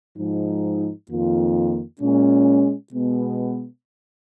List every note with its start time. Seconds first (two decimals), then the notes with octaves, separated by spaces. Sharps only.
0.17 G#2 F3 G#3 D#4
1.08 F2 D#3 A#3 F4
2.00 A#2 G#3 C#4
2.92 B2 G#3 B3